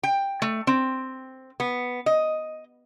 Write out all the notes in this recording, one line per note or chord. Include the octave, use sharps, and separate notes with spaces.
G5
A3
C4
B3
D#5